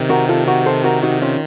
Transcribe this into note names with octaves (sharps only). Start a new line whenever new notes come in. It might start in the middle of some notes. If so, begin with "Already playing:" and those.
Already playing: C3 D#3
F#4 A#4
F4 A4
F#4 A#4
A4 C5
F#4 A#4
D#4 F#4
C#4 F4